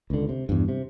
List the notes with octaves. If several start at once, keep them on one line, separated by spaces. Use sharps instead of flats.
C#2 D3
C3
E2 G2
C3